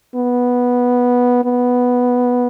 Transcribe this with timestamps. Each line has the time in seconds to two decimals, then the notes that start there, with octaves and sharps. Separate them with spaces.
0.16 B3
1.45 B3